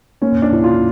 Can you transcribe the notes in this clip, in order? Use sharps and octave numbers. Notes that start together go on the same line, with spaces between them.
A#3 C#4
D4
E4
F4